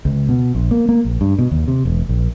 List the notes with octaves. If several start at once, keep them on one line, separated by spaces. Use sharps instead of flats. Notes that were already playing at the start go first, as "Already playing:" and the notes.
C#2
B2
A#1
A#3
A#3
A#1
G2
B2
D#2
C3
E1
A#1